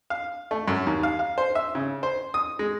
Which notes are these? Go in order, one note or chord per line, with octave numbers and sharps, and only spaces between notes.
F5
A3
F#2
D#2
F5
F5
C5
E5
C#3
C5
D#6
G#3